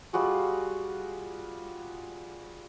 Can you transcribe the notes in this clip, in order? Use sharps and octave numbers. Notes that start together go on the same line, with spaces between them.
G3 F4 F#4 G#4